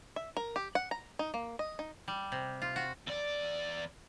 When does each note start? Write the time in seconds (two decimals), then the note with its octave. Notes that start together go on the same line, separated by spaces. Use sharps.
0.16 E5
0.37 A#4
0.56 G4
0.75 F#5
0.91 A#5
1.19 D#4
1.34 A#3
1.59 D#5
1.79 D#4
2.08 G3
2.32 C3
2.62 F4
2.76 F#4
3.07 E2 D5